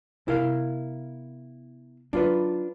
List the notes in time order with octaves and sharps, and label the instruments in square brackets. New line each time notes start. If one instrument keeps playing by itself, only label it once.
[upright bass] C3 B3 [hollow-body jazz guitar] E4 A#4 F5
[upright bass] F#3 D#4 [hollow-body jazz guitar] D4 F4 B4